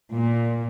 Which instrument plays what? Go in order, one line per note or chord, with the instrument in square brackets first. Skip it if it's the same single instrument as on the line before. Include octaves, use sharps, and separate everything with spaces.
[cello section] A#2